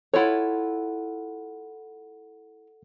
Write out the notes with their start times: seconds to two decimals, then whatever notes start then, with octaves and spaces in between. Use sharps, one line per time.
0.14 E4 F4 A4 C#5 F#5